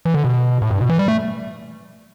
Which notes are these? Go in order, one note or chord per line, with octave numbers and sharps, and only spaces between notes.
E3
D3
B2
A2
G2
B2
E3
G3
A3